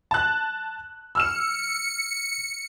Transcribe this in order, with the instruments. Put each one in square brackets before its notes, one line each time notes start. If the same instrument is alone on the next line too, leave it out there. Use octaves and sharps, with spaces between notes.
[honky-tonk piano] A5 F#6
[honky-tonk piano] E6 F6 E7 [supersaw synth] C#7